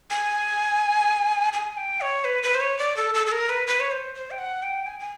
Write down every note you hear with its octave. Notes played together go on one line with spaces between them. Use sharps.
G#5
G#5
G5
C#5
B4
B4
C5
C#5
D5
A4
A4
A4
A#4
B4
B4
C#5
C5
C5
G5
F#5
G5
G#5
G#5